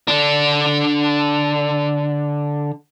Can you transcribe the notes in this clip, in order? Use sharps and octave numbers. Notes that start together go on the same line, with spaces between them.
D3 D4